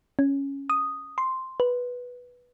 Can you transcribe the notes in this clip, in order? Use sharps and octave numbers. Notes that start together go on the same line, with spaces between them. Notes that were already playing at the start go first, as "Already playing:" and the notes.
C#4
D#6
C6
B4